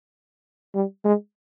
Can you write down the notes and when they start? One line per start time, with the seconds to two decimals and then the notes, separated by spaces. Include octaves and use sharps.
0.75 G3
1.05 G#3